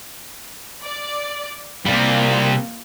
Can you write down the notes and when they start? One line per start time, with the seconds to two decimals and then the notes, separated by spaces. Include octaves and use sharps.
0.82 D5
1.86 C3 G3 A#3 F4